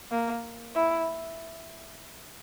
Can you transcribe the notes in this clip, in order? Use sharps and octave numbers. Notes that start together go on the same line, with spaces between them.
A#3
E4